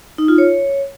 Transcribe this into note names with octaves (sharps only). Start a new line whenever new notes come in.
D#4
F4
C#5